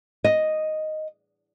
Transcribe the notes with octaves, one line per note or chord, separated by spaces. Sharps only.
D#5